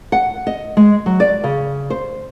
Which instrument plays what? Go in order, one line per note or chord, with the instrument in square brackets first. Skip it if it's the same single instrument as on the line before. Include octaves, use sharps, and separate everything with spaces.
[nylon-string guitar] F#5
D#5
G#3
F#3
D5
C#3
C5